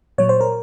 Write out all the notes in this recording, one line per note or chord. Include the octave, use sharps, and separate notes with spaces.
A#2 F#3 C#5
C5
A#4